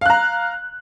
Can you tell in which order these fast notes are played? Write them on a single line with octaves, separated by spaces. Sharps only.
F5 F#6 A#5